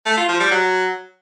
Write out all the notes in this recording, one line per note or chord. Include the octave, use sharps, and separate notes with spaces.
A3
F4
F3
G3
F#3